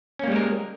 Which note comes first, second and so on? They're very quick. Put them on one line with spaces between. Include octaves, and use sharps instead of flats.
C#4 A#3 G3 G#3 A#4